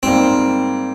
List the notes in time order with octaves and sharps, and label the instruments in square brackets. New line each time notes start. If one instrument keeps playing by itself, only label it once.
[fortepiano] G#2 G3 A#3 [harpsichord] C4